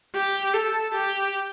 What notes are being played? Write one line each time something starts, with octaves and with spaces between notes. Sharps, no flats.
G4
A4
G4